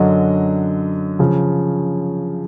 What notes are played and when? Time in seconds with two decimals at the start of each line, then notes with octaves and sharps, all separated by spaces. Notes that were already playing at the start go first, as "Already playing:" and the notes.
Already playing: F#2 D3 F#3 D#5
1.19 C#3 F3